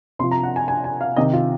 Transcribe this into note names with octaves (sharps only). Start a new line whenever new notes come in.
C3 F3 C6
A#5
F#5
G#5
G#5
G#5
F5
C3 D#3 D#5
F4